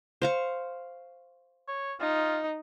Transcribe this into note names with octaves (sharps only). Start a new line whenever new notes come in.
C5 F5 C#6
C#5
D#4 F4